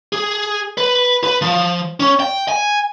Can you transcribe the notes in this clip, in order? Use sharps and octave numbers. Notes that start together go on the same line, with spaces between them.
G#4
B4
B4
F3
C#4
G5
G#5